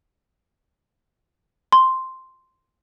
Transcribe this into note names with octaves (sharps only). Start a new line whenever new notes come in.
C6